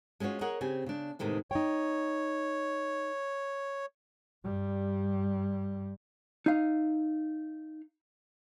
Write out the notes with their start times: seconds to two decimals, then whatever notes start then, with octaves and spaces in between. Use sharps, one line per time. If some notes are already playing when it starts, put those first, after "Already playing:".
0.20 G#3 C#4 F4 F#4 C#5
0.41 G#4 A#4 C#5 D#5 F#5
0.61 C#3 C4 G4 G#5
0.86 C#3 D4
1.19 E2 A2 C3 D#3 G#3 A#3
1.51 D#4 C#5 G5
4.44 G2 G3
6.46 D#4 F5